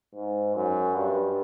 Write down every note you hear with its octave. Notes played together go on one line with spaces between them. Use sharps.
G#2
F#2
G2